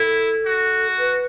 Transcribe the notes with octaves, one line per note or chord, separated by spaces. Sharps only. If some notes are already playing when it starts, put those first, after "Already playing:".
Already playing: E4 A4
F#4
B4